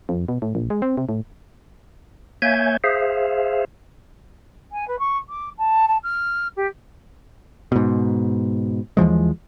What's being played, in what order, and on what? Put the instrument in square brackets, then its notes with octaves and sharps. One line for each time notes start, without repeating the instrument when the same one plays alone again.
[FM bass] F2
B2
A2
A#1
G#3
C4
C3
A2
[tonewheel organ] A#3 C#5 E5 G#5 G6 G#6
G#4 C5 E5 F5
[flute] G#5
B4
C#6
D6
A5
A5
F6
G4
[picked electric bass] G#2 B2
D#2 E3 F3 G#3